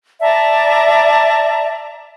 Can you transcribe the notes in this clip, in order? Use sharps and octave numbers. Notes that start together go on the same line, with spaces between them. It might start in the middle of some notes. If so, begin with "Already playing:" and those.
D5 E5 A5 A#5